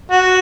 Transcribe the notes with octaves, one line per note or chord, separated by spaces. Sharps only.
F#4